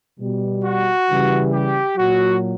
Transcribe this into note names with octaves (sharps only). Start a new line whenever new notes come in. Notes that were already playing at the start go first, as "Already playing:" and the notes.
B2 G3
F#4
C#3 E3 G3
G4
A#2 F#3 F#4